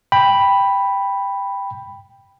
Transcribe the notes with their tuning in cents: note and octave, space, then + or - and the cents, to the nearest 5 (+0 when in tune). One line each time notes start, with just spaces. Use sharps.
G5 +10 B5 +0